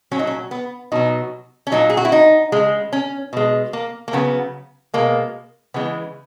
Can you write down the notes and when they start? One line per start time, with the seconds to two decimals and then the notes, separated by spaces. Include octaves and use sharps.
0.11 A#2 F#3 C#4
0.19 D#4
0.27 C#4
0.51 B3
0.92 B2 F#3 D#4
1.67 C#4
1.72 A#2 F#3 D#4
1.90 G#4
1.97 F#4
2.05 E4
2.12 D#4
2.52 C#3 G#3
2.93 C#4
3.33 B2 G#3
3.73 A#3
4.08 A#3
4.13 C#3 F#3 B3
4.94 B2 G#3 A#3
5.74 C#3 E3 G#3 B3